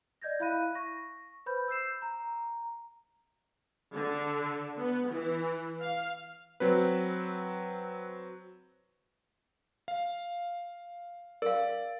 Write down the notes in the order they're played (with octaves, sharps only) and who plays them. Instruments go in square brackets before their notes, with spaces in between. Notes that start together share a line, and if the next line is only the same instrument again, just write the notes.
[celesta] D5 D#5 G6 G#6 A#6
E4 E5 F5 B5 F#6 D#7
C#6 A#6
B4 C5 B5 G6
E6 G6 C7 E7
A#5
[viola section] D3
B3
E3
F5
[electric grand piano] F#3 C4 B4
F5
[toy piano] A#4 F5 [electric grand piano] D5